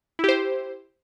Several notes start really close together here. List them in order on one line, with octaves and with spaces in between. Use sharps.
E4 G4 C5